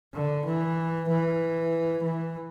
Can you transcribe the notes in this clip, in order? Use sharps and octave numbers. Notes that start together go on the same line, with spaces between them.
D3
E3
E3
E3